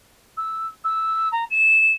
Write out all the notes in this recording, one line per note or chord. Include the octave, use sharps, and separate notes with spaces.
E6
E6
A#5
E7